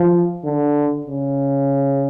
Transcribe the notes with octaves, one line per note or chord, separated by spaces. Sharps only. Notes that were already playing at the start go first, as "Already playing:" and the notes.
Already playing: F3
D3
C#3